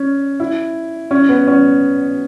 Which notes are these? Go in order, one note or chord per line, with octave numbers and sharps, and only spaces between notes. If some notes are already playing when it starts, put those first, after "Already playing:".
Already playing: C#4
E4
C#4
B3
C#4